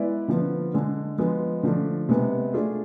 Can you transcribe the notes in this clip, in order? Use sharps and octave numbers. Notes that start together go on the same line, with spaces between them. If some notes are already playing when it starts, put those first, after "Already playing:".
Already playing: G#3 B3 E4 B4 D5
D3 F3 B3
D3 G#3 D4
F3 G#3 B3
D3 F3 A3 D4
C3 G#3 B3
A3 D4 F4 G#4